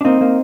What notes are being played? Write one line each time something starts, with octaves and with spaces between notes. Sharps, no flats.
D4
A#3 C4 D#4
A#3